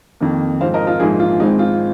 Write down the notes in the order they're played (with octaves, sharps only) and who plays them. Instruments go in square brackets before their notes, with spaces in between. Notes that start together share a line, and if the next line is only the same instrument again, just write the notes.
[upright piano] F2 D#3 A#3
G#2 F3 C4 C5 F5
A#4 D#5
F4 A#4
A#1 G#2 F3 A#3 D#4 G#4
F4
G#1 G#2 G#3 C4 D#4
F4